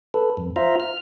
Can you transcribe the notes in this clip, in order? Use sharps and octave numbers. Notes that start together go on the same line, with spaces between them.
A4 B4
F2
F4 C5 E5 F5 A#5
F6